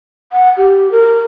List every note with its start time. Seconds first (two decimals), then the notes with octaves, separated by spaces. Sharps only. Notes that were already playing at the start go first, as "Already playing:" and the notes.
0.32 F#5
0.57 G4
0.91 A#4